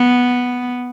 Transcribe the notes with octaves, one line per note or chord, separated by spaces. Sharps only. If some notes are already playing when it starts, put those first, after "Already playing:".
Already playing: B3